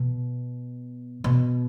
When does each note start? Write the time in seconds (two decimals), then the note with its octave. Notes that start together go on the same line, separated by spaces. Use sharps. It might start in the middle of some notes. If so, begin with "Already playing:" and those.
Already playing: B2
1.24 B2